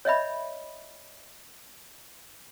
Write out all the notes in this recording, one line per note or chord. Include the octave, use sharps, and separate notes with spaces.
C#5 D#5 E5 B5